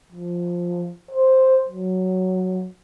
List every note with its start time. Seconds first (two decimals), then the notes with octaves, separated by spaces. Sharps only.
0.12 F3
1.11 C5
1.69 F#3